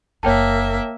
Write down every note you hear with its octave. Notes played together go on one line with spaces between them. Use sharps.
F#1 A#3 D#4 C#5 E5 G5 A5